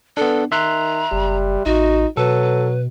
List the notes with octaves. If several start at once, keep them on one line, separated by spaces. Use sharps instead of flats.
B3 D4 A4
D#3 E5 A#5 C6 F#6
F#1 G3
A1 D#4 F#4
B2 F#3 A4 B4